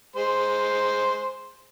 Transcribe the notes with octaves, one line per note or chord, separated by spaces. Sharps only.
G#3 C5 C6